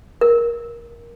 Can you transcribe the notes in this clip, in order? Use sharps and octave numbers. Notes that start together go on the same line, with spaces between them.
A#4